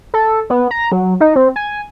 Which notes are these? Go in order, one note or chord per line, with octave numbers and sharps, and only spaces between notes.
A4
B3
A#5
F#3
D#4
C4
G#5